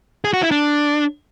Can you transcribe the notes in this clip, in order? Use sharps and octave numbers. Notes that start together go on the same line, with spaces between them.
G#4
F#4
E4
D4